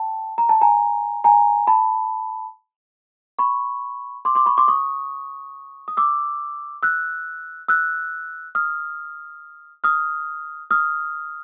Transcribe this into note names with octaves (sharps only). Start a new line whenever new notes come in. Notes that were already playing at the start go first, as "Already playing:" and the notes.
Already playing: G5 A5
A#5
A5
G#5 A#5
G#5 A#5
A5 B5
B5 C#6
C6 D6
C6 D6
B5 C#6
C6 D6
C#6 D#6
D#6
D6 E6
E6 F#6
E6 F#6
D#6 F6
D#6 F6
D#6 F6